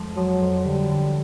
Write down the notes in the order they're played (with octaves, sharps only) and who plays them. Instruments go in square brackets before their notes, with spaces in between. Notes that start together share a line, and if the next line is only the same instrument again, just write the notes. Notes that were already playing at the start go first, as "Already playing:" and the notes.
Already playing: [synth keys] F2 F3 G#3
[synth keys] F3 [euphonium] F#3
[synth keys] F2
[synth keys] D3 [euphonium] G3
[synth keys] D3